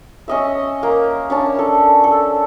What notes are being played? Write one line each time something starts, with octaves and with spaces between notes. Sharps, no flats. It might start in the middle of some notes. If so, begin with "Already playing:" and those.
C#4 D#5 E5
A#3
C#4 D4 A5
A4
A4